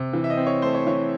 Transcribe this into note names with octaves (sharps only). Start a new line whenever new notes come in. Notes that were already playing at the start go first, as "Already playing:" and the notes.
Already playing: C3
E3
E5
D#5
C4
C#5
A3 C5
C#5
E3 C#5